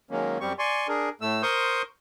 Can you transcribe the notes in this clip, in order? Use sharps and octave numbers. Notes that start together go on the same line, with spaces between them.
D#3 F#3 G#3 A#3 C#4
F#2 G3 C4 G4 C#6
D5 G#5 C6 C#6
D4 G#4 A#4
A2 A3 E6
A#4 C5 C6 C#6 D#6 G6